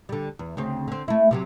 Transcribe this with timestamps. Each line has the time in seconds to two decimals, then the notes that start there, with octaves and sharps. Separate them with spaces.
0.09 D3 G3
0.39 E2
0.57 D2 C#3 C4
0.88 D3 C4
1.08 A3 E4
1.31 C3 F3 F#3